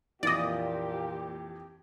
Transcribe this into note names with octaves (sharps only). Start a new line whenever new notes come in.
F2 A#2 E3 G4 D5 D#5